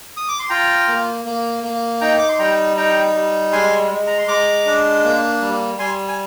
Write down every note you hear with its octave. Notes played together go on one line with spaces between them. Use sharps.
D#6
D6
C6
F4 G5 A#5
A#3
A#3
A#3
D#4 G5 A#5
D6
C6
G3 G5 A#5
D#4 G5 A#5
G3
G#3 G#5 C6
G#3
A#5
C6
G#3 A#5 D6
D4
A#3
G3
G3 G#5 C6
G#5